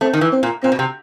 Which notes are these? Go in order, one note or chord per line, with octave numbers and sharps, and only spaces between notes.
A3 C4
D#3
E3
C4
A#2
A#2 C4
B2
C3